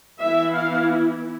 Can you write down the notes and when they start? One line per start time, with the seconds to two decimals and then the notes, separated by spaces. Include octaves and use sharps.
0.20 E3 B3 E4 E5
0.54 F5